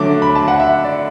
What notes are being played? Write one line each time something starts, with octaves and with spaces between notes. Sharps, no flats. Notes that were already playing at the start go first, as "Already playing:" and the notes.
Already playing: D3 F#3 A3 D6
B5
A5
F#5
E5
D5